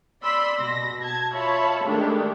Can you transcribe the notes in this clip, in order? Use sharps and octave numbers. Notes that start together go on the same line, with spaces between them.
D5 B5 C6 E6
B2 A#6
A5 G#6
F4 C#5 E5 A5 B5
D#3 G#3 A3 D4 G4